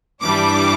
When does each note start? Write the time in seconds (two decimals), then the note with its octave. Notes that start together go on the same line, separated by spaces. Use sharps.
0.22 G2 E3 G3 D4 D6